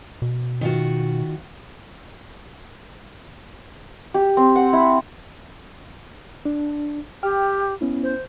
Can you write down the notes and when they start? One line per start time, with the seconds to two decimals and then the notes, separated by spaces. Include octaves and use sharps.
0.22 B2
0.61 D#3 F4 F#4
4.14 G4
4.37 C4
4.56 F#5
4.73 E4
6.45 D4
7.23 G4 G5 F6
7.81 B3 C#4 E4
8.03 C5